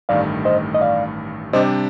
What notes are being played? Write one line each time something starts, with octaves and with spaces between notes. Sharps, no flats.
A1 G2 D#3 A3 D5 F5
C5 D#5
D#5
D5 F5
C3 G3 D4 G4 C5 D#5